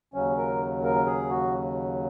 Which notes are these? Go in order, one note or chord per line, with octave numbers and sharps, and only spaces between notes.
D#2 C#3 F#3 C#4
A#4
A#4
G#4
F#4